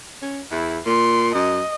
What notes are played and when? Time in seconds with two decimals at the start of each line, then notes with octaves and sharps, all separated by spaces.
0.22 C#4
0.51 E2 E4
0.86 A#2 C6
1.34 F#2 D#5